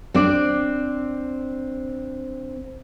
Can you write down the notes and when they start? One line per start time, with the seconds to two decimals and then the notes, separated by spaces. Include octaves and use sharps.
0.14 C4 D4 D5